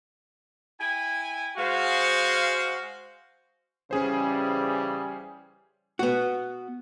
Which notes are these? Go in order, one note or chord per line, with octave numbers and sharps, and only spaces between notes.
E4 G5 G#5
G#3 F#4 C5 F5
C#3 E3 G3 C#4 G#4 C5
B3 F#4